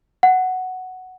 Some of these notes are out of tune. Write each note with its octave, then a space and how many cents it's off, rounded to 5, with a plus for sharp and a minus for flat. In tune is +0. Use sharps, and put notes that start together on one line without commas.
F#5 +5